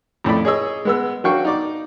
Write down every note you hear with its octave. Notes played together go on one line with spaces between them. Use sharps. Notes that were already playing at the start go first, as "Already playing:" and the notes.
F2 A2 D5 B5
G#4 C#5 D#5 E6
G#3 B3 E6
F#3 D4 F#4 F5 G5 C#6
D#4 D5 D6